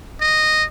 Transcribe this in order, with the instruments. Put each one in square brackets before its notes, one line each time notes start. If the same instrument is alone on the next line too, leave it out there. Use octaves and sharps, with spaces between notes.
[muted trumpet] D#5